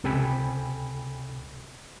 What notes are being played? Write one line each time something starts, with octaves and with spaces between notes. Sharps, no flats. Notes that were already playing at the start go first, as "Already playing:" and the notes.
C#2 C3 A4 G5 G#5 B5